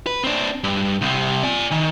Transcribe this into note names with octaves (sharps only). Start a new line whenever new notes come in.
B4
C4 D4
G2
C2 C3
D5 G#5
D#3